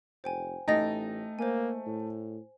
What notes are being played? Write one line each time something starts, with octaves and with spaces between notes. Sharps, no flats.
F1 C5 G5 G#5
A1 A3 D#4 G5 A6 A#6
A#3 C5 G#5
A2